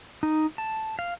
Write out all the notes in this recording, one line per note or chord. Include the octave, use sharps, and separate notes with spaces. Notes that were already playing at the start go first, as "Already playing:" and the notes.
D#4
A5
F5